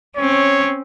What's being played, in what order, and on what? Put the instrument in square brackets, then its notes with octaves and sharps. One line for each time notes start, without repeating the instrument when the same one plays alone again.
[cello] C4 C#4 [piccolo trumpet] C#5